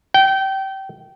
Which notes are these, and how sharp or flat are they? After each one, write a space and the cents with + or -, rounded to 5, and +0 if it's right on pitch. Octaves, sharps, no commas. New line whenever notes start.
G5 -25